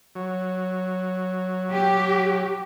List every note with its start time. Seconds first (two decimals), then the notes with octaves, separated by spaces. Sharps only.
0.15 F#3
1.71 G4